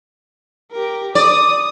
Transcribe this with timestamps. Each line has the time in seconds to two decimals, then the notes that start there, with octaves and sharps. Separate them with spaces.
0.72 G4 A#4
1.15 D5 D#6